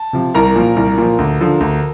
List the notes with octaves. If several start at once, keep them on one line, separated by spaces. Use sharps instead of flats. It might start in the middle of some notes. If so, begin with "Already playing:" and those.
Already playing: A5
C3 F3
C2 A#4 A#5
A#2 F3
C2
A#2 F3
D2
D3 F3
D2